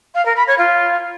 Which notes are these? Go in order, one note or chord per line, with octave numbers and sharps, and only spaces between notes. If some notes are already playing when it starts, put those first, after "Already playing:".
F5
A#4
B5
C#5
F4